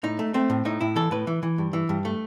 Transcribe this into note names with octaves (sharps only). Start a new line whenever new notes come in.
A2 D#4
A3
A3 C4
A2
A2 D#4
A2 E4
E3 A4
A2 B4
E3
E3
G2
E3
G2
A3